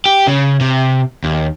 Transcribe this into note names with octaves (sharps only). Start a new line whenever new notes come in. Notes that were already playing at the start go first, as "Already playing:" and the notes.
G4
C#3
C3
D#2